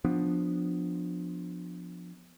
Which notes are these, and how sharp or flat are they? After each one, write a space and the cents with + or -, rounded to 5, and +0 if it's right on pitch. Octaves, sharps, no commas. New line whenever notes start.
F3 +15 B3 +15 D4 +0